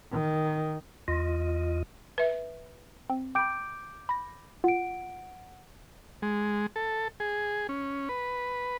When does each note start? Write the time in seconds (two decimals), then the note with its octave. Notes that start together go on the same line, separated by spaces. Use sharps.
0.12 D#3
1.08 E2 F4 D#5
2.18 B4 E5
3.10 C4
3.35 G5 B5 D6 G6 D7
4.09 B5 A#6
4.64 F4 F#5 D7
6.22 G#3
6.76 A4
7.20 G#4
7.69 C#4
8.09 B4